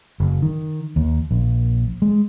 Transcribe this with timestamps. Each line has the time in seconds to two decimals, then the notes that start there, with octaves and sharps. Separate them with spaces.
0.20 F#1
0.42 D#3
0.96 D#2
1.31 A#1
2.02 G#3